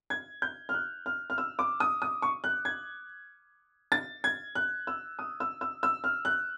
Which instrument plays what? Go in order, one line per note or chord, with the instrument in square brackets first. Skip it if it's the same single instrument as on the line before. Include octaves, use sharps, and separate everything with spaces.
[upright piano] G#6
G6
F6
F#6
F6
F6
E6
D6
D#6
D#6
C#6
F#6
G#6
A6
G#6
F#6
E6
D#6
E6
E6
E6
F6
F#6